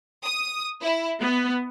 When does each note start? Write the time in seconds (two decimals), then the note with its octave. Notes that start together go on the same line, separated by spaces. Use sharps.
0.23 D#6
0.81 E4
1.21 B3